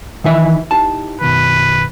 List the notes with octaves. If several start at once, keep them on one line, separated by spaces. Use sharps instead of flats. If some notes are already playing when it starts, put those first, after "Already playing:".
D#3 E3 E5
D#4 E4 G4 A5
F#2 B2 D#3 B4